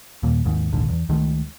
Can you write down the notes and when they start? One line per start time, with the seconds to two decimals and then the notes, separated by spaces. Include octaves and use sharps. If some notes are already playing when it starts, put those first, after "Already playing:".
0.23 D#2 A#2
0.45 D#2 G#2
0.72 A#1 D#2 G#2 D3
0.89 E2
1.09 C#2 D#3 G#3 A3